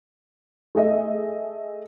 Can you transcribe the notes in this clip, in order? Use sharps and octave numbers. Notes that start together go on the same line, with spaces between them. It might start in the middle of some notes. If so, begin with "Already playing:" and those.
A3 G#4 D#5 E5